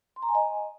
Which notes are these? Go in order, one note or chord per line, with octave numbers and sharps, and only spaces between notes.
C6
A#5
G#5
D#5